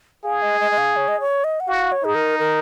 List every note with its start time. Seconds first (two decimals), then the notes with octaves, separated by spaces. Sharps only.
0.24 G#4 F5
0.42 D#5
0.60 D#5
0.71 D#5
0.78 F5
0.96 C#5
1.08 D#5
1.20 C#5
1.44 D#5
1.60 F#5
1.68 F#4 F5
1.92 C#5
2.03 D#4 G#4
2.15 A#4
2.39 A#4